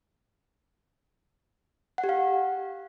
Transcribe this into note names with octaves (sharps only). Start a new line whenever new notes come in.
F#5
G4
F5